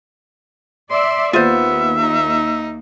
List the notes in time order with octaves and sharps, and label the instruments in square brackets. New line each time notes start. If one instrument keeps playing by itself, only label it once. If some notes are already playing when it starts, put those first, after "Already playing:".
[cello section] D5 E5 [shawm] C6
[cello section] D#2 A#3 [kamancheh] B3 [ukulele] F4 C5 [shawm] E5
[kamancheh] D#4